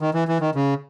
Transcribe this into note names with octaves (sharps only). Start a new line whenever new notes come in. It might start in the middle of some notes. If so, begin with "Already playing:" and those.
D#3
E3
E3
D#3
C#3